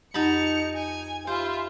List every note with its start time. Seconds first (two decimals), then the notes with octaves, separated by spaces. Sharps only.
0.14 F2 D#4 G4 F#5 A5 B5 C#7 F7
0.76 G#5
1.27 F4 G4 C5 E5 G#5 B5